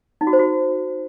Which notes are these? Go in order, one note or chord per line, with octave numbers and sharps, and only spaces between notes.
D#4
F#4
C5
F#4